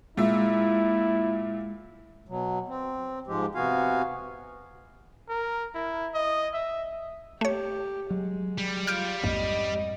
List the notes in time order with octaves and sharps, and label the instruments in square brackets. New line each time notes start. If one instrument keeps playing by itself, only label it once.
[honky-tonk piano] A#2 E5 [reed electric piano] G#3 [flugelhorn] E4
[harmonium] B2 F#3
C4
G#2 F3 G#3 G4
C3 B3 F#4 F5 G#5
[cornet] A#4
E4
D#5
E5
[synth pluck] A3 C#5 [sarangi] G4
[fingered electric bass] F#3 [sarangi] G#3
[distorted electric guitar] G3
[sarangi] F4 [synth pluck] F6 G6 D7
[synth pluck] A#1 [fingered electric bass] F2 G#2 [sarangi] D#5